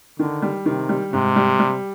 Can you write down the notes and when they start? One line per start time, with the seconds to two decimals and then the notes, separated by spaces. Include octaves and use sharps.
0.19 D3 D#3
0.42 G3
0.65 C3 D#3
0.89 G3
1.13 G#2 C3
1.36 G3
1.59 G3